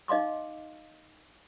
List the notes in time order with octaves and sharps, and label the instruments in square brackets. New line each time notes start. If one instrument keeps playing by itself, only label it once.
[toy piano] D#4 D#5 F5 C6 D6